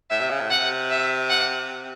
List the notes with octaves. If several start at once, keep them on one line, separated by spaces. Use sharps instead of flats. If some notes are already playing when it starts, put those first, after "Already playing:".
A2 E5
C3
C#3
A2
C3 F#5
E5
F#5